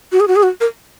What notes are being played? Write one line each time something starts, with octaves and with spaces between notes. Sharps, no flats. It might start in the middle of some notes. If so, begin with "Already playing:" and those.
F#4
G#4
F#4
G#4
F#4
A#4